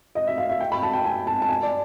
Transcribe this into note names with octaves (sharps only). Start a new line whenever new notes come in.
D#5
E5
F5
E5
G5
B5
A5
G5
G#5
A5
A5
G#5
D5